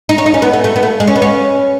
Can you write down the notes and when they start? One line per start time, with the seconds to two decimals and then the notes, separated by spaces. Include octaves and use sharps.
0.09 D#4
0.18 C#4
0.26 D#4
0.34 C#4
0.42 B3
0.53 A3
0.64 A3
0.76 B3
0.83 A3
1.00 G#3
1.07 C#4
1.16 B3
1.22 C#4